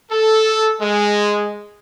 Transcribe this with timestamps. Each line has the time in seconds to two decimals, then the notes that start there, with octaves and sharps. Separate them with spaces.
0.11 A4
0.81 G#3